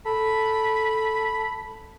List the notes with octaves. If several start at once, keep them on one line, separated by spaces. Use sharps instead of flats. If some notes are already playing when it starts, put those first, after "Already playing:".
A4 B5